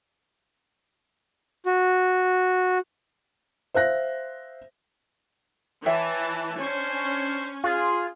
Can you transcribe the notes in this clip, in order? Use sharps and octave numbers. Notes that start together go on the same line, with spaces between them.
F#4
C5 E5 F5 F#6 A#6
E3 C#5 E5 G5 A5
C#4 D4 C5
F4 G#4